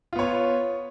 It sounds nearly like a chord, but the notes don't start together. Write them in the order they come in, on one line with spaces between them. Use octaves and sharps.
F4 B3 C#5